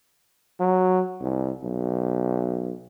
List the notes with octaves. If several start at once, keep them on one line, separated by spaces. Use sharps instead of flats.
F#3
C2
B1